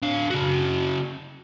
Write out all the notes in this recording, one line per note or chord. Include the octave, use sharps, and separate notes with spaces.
D3 F5
C#3 F#4